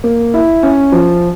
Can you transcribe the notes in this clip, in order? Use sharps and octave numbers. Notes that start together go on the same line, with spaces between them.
A#3
E4
C#4
F3